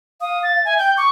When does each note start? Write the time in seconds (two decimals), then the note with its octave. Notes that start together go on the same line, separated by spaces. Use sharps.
0.21 F5 D#6
0.43 A6
0.65 E5 G#5
0.79 G5 G6
0.97 C#6 D6